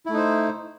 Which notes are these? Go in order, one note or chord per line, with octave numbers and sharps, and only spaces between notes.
A3 D#4 E4 C5